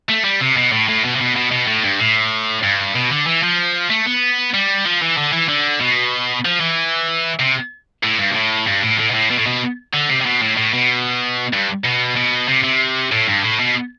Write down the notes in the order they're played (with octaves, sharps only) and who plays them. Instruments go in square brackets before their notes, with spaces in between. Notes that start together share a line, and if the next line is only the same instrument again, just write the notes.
[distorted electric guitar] A3
G3
C3
B2
A2
A2
B2
C3
B2
B2
B2
A2
G2
A2
G2
B2
D3
E3
F3
A3
B3
G3
F3
E3
D3
E3
D3
B2
F3
E3
C3
A2
G2
B2
A2
G2
A2
A2
B2
A2
B2
A2
B2
D3
C3
C3
B2
A2
A2
B2
G2
B2
B2
C3
C3
A2
G2
A2
B2